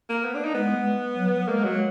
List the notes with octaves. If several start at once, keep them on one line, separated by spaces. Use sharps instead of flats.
A#3
B3
D4
D#4
G#3 B3
F#3
G#3 A#3
F#3